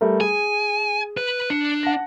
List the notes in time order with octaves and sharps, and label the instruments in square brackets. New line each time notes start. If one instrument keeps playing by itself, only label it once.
[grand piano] G3 A3 A#4
[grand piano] G#4 [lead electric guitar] G#5
[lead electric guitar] B4
[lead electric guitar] D4 [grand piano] C#7
[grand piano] F#5 A5 A#6